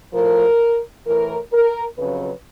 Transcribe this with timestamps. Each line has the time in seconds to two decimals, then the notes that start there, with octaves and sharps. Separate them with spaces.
0.13 A2 F3 A#4
1.05 A2 E3 A#4
1.52 A#4
1.98 F2 C#3 F#3 B4